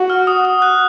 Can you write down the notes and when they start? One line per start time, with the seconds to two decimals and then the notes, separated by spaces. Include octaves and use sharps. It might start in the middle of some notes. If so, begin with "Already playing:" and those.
Already playing: F#4
0.10 F6
0.27 D#6
0.45 D#6
0.62 F#6